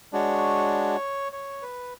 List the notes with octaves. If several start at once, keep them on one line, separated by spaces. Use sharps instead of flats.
G#3 D4 F#4 C#5
C#5
B4